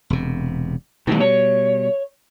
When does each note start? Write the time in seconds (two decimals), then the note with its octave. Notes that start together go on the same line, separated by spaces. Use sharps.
0.10 E1 C3
1.07 B2 D#3 E3 G3 A3
1.20 C#5